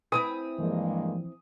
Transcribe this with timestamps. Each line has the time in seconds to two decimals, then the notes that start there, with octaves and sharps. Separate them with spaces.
0.12 C4 E4 B4 D#6
0.59 G2 E3 F3 G#3 A#3